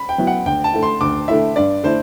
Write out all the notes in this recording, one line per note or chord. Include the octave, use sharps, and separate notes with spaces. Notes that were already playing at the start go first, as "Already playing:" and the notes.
Already playing: B5
G5
F#3 B3 E4
F#5
D2 G5
A5
D3 A3 E4
C6
D2 D6
D3 A3 E4 E5
G2 D5
D3 A3 E4 C5